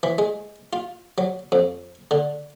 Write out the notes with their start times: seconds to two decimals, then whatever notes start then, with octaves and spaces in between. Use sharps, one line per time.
0.03 E3
0.18 G#3
0.73 F4
1.18 F#3
1.52 F2
2.11 D3